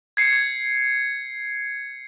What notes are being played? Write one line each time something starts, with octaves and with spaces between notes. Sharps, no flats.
G#6 C7 C#7